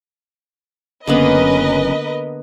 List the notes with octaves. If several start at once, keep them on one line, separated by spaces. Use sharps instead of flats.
F#1 D3 A#3 B3 C#4 A#4 B4 D#5